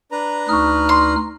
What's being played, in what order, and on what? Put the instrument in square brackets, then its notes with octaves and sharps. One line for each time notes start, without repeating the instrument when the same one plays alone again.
[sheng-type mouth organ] D4 B4 A#5
[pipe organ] D2 D#4 F6 [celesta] C#6 D#6
[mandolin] C6